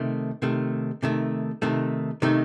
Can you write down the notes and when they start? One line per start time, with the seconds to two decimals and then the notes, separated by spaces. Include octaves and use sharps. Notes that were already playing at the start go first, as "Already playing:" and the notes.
Already playing: C3 D#3 A3
0.42 C3 D#3 A3
1.03 C3 D#3 A3
1.62 C3 D#3 A3
2.22 C3 D#3 A3 D#4